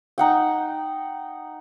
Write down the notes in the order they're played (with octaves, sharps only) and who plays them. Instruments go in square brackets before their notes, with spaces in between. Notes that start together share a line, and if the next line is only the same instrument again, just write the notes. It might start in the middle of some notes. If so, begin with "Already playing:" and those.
[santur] D#4 F#5 G5